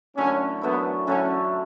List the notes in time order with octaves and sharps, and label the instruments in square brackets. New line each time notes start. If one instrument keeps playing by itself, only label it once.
[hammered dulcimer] F#2 D3 A3 E4 [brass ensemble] C#4
[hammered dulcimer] F#2 D3 A3 E4 [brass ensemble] B3
[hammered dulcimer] F#2 D3 A3 E4 [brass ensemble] C#4